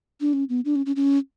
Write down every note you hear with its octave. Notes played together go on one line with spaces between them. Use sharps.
D4
C#4
B3
D4
C#4
C#4
C#4